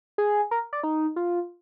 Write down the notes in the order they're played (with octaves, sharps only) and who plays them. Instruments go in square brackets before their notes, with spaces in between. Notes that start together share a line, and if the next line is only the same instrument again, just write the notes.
[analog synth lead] G#4
A#4
D5
D#4
F4